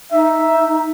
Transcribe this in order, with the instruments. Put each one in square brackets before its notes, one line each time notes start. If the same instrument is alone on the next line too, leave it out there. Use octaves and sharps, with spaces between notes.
[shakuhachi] D#4 [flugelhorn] E5